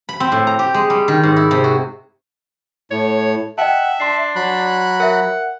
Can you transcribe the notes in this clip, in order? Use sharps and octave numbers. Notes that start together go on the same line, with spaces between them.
B5
C4
A2
A#5
G4
G#3
G3
D#3
G#2
E4
C3
F#4
A2 C#5
D#5 E5 F#5 G5 A5
D4 A5 C6 C7
F#3 B5 F#6
A#4 E5 F#5